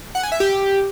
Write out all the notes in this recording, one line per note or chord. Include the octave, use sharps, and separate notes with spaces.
F#5
G#5
E5
G4